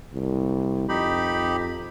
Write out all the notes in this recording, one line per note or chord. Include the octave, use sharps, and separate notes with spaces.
C2
F2 D#4 G4 B5